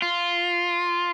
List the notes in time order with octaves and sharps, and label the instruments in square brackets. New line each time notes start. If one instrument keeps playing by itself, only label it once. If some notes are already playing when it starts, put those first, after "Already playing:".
[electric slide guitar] F4